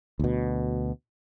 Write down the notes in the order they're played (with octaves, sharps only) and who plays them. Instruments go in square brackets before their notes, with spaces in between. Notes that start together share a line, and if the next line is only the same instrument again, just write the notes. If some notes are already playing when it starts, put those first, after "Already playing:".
[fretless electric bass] D2 B2